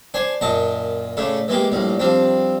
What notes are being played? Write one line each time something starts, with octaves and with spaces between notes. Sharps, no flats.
D4 C5 G#5
F#2 A#2 D#5 A5
A2 C#3 A3 D4
E3 G#3 A#3 G4
A#1 A2 G3
F3 G3 C4 D4